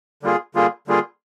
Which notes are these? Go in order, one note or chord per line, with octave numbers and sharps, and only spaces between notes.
D3 G3 A#3 F4 G#4
D3 G3 A#3 F4 G#4
D3 G3 A#3 F4 G#4